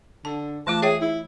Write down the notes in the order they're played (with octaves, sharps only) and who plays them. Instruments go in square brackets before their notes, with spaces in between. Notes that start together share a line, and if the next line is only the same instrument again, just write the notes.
[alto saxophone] D3 [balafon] A5
[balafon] E3 A3 F4 [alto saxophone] A5
[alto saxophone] G#4 [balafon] C#5 E5 G5
[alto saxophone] E4